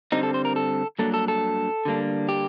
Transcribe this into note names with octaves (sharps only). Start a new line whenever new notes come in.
G2 D3 G3 C4 D#4
A4
C5
A#4
A4
G2 F#3 A#3 D4 A4
A4
A4
D3 G3 A#3 D4
G4